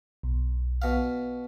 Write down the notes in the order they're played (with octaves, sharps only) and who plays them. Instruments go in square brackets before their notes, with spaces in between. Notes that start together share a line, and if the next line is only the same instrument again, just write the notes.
[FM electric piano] B1
[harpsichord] B2 F5